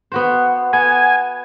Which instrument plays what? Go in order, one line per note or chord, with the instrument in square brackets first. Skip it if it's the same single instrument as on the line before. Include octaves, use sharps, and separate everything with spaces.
[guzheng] B3 F#4 C5
[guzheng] B3 [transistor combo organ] G#5